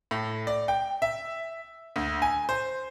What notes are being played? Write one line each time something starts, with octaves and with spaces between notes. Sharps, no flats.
A2
D5
G5
E5
D2
G#5
C5